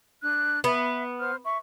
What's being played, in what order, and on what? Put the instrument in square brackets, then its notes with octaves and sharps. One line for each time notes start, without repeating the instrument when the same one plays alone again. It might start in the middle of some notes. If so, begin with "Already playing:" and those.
[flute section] D4 F#6
[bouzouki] B3 [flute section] E5
[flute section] C5 F6
E5 C#6